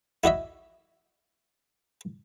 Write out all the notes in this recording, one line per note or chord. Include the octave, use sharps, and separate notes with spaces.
E4 F#4 D#5 E5